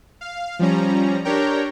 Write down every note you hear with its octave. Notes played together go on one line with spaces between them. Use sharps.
F5
F3 G3 C#4 A#5
D4 G4 A#4 C#5 G5 A#5